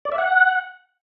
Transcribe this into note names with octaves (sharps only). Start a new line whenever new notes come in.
D5
E5
F#5